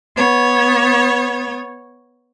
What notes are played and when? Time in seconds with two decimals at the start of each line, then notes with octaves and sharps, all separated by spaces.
0.16 B3 C#5